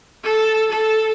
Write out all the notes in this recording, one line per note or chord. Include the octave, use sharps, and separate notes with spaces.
A4
A4